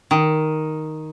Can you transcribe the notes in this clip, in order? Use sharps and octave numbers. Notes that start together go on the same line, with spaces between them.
D#3